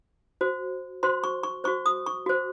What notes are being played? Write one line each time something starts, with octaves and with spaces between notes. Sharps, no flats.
F#4 C5
F#4 C5 C6
C#6
C#6
F#4 C5 C#6
D#6
C#6
F#4 C5